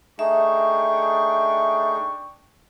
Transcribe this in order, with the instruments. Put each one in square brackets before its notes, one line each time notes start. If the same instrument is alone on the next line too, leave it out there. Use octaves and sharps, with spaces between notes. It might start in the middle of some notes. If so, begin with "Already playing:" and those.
[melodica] A3 D#4 G#4 [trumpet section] D4 G5 C#6 [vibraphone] E5